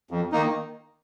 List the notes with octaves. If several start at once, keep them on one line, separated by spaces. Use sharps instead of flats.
F2
D#3 A#3 D#4